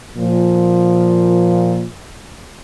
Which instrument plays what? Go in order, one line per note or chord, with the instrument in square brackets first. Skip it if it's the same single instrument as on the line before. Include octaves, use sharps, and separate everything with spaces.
[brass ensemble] A#2 F3